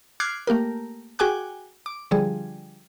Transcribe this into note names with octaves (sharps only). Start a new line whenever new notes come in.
D6 F6 F#6 G#6 C7
A3 A#3 G4 A#4
F#4 G#4 G5 G#5 D6 F#6
D6
D3 F3 G3 G#4